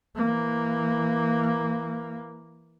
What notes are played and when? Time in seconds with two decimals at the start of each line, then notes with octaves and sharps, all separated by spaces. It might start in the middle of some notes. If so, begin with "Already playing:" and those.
0.16 E3 A#3